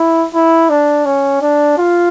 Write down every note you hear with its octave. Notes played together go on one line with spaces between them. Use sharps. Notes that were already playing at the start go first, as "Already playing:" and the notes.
Already playing: E4
E4
D4
C#4
D4
F4